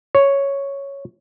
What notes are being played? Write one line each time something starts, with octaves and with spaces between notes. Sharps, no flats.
C#5